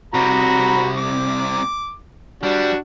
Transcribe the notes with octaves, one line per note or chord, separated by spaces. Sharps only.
C2 C3 F#4 A#5 B5
D6
G3 D4 F#4